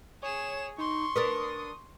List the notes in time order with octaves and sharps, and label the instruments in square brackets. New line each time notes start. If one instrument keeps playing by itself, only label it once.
[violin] G#4 E7 [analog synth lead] C#5
[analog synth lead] D#4 [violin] C6 C#6
[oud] D4 A#4 B4 [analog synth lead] D#6